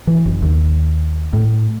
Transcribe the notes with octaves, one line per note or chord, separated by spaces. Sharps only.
E3
F#1
D#2
A2